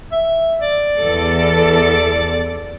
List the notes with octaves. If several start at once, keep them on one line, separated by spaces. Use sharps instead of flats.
E5
D5
E2 A4